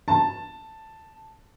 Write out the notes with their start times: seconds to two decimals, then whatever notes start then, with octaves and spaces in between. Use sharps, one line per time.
0.08 A5